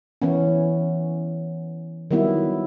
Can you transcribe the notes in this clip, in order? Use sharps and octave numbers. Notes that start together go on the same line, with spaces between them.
E3 B3 C#4
D#3 F#3 G3 B3 E4